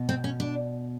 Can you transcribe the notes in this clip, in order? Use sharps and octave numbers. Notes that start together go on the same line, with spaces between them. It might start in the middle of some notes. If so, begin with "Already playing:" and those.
Already playing: B2
C4
C#4
D4